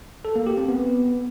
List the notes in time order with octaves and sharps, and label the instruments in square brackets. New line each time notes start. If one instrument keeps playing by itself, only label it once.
[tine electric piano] A4
A#3
G4
C4
B3